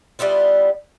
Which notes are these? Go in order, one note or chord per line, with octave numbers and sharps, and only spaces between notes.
G3 B3 E4 F4